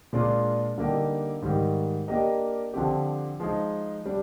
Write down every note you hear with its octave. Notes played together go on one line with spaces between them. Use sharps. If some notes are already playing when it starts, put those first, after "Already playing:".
A#2 G#3 D4 F4
D3 G3 A#3 D#4 G4
G#2 D#3 G3
A#3 D4 G4 A#4 D#5
D3 F3 C4 G4
F3 G#3 D#4
G3 D4